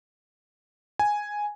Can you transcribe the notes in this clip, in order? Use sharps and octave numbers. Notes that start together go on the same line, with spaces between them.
G#5